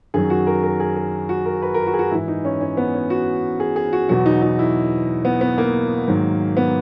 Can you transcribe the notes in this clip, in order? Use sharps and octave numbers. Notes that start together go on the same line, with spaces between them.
F#2 D#3 F#3 G#4
F#4
A#4
A#4
G#4
G#4
F#4
A#4
B4
A#4
F#4
G#4
F#4
G#2 E3 E4
D#4
C#4
C#4
B3
C#4
F#4
G#4
G#4
F#4
E2 B2 F#3 F#4
D#4
D#4
E4
B3
B3
A#3
G#2 D#3 F#3
B3